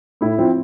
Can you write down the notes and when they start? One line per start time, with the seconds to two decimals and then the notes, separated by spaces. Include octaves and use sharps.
0.21 A2 E4
0.38 F3 C4